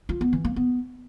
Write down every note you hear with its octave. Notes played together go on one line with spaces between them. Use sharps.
F4
B3
E3
A#3
B3